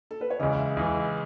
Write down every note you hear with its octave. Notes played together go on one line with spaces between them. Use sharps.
A4
B4
C#5
C#2 C#3 E3 D#5
E5
C#2 C#3 E3